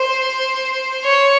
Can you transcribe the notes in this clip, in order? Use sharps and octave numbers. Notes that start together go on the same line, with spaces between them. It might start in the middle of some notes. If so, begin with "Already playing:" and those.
Already playing: C5
C#5